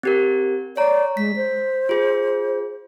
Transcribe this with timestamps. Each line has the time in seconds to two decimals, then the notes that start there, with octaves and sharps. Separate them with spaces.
0.03 C4 G4 A#4
0.77 C#5 D5 A#5
1.17 G#3 B6
1.36 C5
1.89 F4 G#4